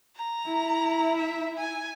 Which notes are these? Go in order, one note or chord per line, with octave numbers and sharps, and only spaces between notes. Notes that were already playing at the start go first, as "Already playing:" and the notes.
A#5
E4
E5
G#5